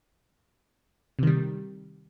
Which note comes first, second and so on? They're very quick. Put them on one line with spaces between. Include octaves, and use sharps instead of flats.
C3 D#3 G3